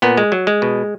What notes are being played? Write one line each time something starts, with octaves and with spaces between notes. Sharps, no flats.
A#2 B3
G#3
F#3
G#3
B2